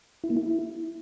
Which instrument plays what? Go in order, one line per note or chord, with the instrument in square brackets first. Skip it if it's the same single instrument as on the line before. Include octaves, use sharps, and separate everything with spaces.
[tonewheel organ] E4
A#3
E4